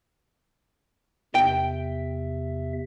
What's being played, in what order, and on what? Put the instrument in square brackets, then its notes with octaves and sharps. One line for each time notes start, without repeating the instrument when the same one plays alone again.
[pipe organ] E2 C3 E5 [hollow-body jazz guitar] G5